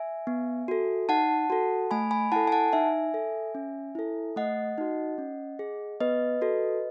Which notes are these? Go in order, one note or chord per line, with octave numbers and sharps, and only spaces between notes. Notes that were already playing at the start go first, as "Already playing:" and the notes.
Already playing: E5 G#5
B3
F#4 A4
D#4 F#5 A5
F#4 A4
A3 G#5 B5
G#5 B5
E4 A4 F#5 A5
G#5
F#5 A5
D#4 E5 G#5
A4
C#4
E4 A4
A3 D#5 F#5
D#4 F#4
C#4
G#4
B3 B4 D#5
F#4 A4